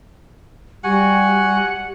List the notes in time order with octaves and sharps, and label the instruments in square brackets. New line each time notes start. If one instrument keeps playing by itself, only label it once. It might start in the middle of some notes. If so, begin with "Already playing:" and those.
[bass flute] G3 [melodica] F#4 G#5 [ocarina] G4 [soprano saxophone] F#5